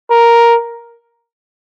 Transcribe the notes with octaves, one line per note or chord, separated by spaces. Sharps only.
A#4